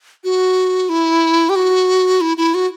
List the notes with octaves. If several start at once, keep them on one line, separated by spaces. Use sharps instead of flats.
F#4
E4
G4
F#4
E4
E4
F#4